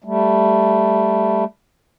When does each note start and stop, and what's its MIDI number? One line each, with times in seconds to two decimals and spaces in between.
0.04 1.44 55
0.04 1.44 57